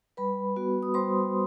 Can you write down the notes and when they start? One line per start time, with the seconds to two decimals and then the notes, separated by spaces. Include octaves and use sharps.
0.17 G3 B4 B5
0.56 B3 F#4
0.83 D#6
0.94 G3 C5 C6